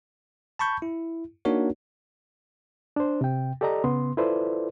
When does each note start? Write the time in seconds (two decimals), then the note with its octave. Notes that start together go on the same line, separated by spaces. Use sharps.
0.59 A5 B5 C#6 G6
0.82 E4
1.45 A#3 D4 D#4 F#4 A#4 C#5
2.96 D4 C5
3.21 C3 G5
3.61 G4 A4 D5 D#5 A#5
3.84 C#3 B3 C6
4.17 E4 F4 A4 B4 C5 D5